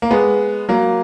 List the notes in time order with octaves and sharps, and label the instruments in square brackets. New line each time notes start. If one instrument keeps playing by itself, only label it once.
[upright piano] A#3
G#3 B3
F#3 A#3